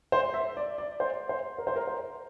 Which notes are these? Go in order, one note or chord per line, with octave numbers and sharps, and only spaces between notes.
C5
E5
D5
D5
C5
C5
A#4
C5
A#4
C5